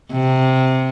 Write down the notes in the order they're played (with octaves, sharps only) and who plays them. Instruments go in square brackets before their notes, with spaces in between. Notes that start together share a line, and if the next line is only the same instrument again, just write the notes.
[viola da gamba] C3